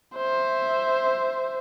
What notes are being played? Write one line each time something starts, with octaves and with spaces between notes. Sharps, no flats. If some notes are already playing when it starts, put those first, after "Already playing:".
C5 E5